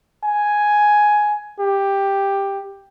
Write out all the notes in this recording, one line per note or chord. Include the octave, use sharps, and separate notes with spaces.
G#5
G4